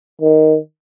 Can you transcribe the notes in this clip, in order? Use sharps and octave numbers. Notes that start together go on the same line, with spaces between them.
D#3